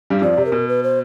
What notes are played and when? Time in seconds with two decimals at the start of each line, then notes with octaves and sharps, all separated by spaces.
0.10 G2 G3
0.22 F2 F3 D5
0.37 C3
0.45 A#4
0.52 B2
0.68 B4
0.83 C5